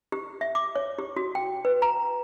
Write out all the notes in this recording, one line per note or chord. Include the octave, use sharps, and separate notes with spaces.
G4
E5
D6
C#5
G4
F#4
G5
B4
A#5